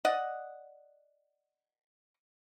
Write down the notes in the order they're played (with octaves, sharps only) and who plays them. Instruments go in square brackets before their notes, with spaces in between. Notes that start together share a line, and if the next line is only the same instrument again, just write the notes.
[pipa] D5 D#5 F#5